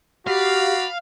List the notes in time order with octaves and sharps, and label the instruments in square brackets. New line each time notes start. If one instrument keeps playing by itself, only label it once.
[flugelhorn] F#4 [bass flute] G4 [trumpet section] D5 A#5 B5 [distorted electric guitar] F5